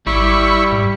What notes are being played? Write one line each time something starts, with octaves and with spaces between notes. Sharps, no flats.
G#1 G3 E4 B5 C#6
G#2